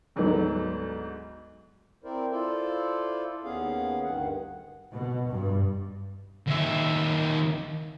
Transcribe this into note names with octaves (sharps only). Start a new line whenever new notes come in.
D2 G#2 F#3 B3
C4 E4 A#4 C5 D5
E4 F4 A4 C5 D5
D#2 B3 C#4 G#4 F5
D2 G2 D#3 F#5
B2
G2
D#2 E5